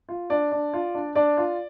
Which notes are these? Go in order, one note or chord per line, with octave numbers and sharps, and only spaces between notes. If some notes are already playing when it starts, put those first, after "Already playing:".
F4
D4 D5
D4
F4
D4
D4 D5
F4